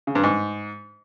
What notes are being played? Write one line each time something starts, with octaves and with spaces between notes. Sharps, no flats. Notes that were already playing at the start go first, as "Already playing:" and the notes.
C#3
G2
G#2